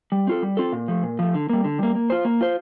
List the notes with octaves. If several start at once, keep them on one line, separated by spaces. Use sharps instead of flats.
G3
C4 F4 A4
G3
C4 F4 A4
A#2
F3 A3
A#2
F3 A3
D3
G3 A#3
D3
G3 A#3
A#3
F4 C5
A#3
F4 C5